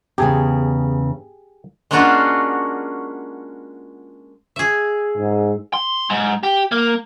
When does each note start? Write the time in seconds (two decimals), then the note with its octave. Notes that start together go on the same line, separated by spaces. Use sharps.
0.18 E2 C#3 G4 G#4
1.91 G#3 A#3 C#4 D4 F4 F#4
4.56 G#4 E5
5.18 G#2
5.73 C6
6.10 G#2
6.43 G4
6.72 A#3